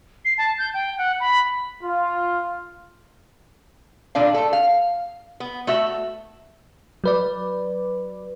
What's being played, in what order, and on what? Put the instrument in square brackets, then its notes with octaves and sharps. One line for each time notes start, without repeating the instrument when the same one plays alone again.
[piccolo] C7
A5
G6
G5
F#5
B5
[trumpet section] F4
[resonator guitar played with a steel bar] A#2 D3 D4 F5
A3 A4
F5
B3
A3 F#4 E5
[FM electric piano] F#3 B4 D5